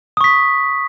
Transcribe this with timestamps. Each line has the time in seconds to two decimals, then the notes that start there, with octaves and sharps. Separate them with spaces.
0.17 D#6
0.21 C#6
0.24 B6